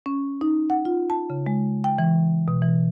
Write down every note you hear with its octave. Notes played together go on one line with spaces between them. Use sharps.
C#4
D#4
F#5
F4
A5
C#3
G#3
G5
E3
B2
E3